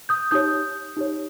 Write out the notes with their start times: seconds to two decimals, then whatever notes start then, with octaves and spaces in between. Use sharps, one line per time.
0.09 D#6 G6
0.31 D#4 G4 C#5 D#6 G6
0.97 D#4 G4 C#5